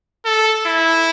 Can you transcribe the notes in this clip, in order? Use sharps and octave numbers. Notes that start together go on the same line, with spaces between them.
A4
E4